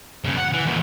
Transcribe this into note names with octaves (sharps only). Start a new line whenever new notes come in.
G2 C#3
F#5
E3
E2 A#2